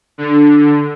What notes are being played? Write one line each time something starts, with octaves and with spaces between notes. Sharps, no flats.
D3